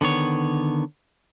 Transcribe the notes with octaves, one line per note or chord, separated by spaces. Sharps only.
D3 D#3 B3 C#5